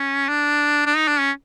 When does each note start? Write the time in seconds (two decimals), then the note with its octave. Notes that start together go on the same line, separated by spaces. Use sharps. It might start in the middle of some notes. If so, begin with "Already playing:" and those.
Already playing: C#4
0.29 D4
0.86 D4
0.96 D#4
1.08 D4
1.19 C#4